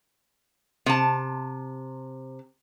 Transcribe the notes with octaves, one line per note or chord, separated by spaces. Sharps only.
C3 A5